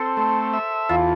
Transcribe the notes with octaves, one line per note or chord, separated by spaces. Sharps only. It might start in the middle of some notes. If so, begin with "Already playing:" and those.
Already playing: C4 A4 C5
A3
E5
E2 F4